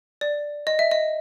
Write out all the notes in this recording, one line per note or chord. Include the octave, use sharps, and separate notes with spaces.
D5
D#5
E5
D#5